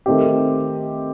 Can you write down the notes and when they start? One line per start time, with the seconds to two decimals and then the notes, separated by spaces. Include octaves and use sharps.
0.06 D#3 A3 C4 D#4 G4